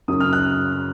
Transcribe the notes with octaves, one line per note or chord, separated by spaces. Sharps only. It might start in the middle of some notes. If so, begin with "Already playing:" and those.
F#2 C#3 F#3 D#6
F6
F#6